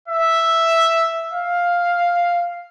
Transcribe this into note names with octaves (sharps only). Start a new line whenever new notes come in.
E5
F5